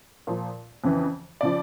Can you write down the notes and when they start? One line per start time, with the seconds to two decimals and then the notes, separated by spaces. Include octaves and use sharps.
0.27 A#2 F3
0.84 F2 C#3 E3
1.41 C#3 F3 D5